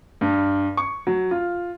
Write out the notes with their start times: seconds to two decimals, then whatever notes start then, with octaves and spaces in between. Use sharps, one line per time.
0.21 G2
0.77 C#6
1.07 F#3
1.31 F4